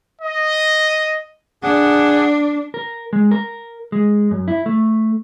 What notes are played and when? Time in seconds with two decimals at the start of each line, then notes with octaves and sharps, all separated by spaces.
0.21 D#5
1.63 D4 G#4 F#5
2.74 A#4
3.13 G#3
3.31 A#4
3.92 G#3
4.31 F#2
4.48 E4
4.66 A3